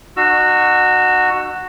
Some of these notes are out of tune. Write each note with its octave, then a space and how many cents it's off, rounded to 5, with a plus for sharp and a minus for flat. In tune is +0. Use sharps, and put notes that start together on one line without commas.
D#4 -45 F#4 +0 E6 +20